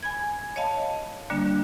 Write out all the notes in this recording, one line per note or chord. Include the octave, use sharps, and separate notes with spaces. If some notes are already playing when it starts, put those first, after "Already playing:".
G#5 B5 G#6
C#5 D#5 F5 A5 B5
D3 G3 A#3 D4